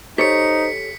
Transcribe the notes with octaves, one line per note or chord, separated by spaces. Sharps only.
D#4 G4 A4 C5 C#5 B6 C#7